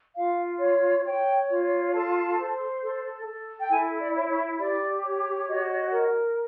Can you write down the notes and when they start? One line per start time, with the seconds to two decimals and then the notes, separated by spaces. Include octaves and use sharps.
0.17 F4 F5
0.61 C#5
1.05 C#5 G5
1.50 F4
1.94 A4 A5
2.38 C5
2.82 A4
3.26 A4
3.60 G5
3.70 E4 G#5
4.00 D5
4.15 C#5
4.25 D5
4.30 C#5
4.59 G4 D5
5.03 C#5
5.48 F#4 D#5
5.92 A#4